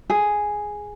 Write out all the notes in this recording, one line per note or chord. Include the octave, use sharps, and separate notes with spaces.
G#4